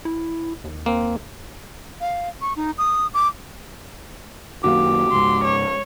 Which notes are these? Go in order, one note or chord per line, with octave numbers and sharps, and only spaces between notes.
E4
D#2
A#3 C4
F5
C#6
D#4
D#6
D6
F#2 D#3 A#3 F#4 G4 F5
C#2 G#2 C6
C#5